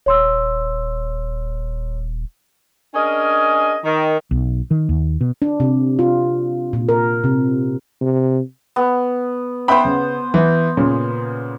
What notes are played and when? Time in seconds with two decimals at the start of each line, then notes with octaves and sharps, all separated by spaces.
0.06 D#1 C#5 C6 E6
2.94 C#4 D4 G#4 A#4 D#5 G#5
3.84 D#3
4.31 B1
4.71 D#3
4.89 D#2
5.21 B2
5.42 D4
5.60 C3
5.99 F4
6.73 A#2
6.89 A#4
7.24 C3
8.01 C3
8.76 B3
9.68 B3 C5 E5 G5 B5
9.85 C#3
10.34 E3
10.77 A#2 C#3